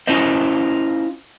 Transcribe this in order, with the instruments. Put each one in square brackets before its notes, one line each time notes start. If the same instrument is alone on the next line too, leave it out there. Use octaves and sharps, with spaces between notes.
[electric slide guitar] C#4 E4 F4 C5 D#5